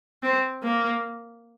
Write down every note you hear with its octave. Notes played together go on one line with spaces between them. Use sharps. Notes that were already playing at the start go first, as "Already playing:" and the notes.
C4
A#3